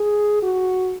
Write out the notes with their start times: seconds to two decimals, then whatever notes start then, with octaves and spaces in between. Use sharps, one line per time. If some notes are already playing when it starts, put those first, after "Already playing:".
Already playing: G#4
0.43 F#4